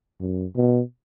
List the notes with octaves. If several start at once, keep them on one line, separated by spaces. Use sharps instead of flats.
F#2
B2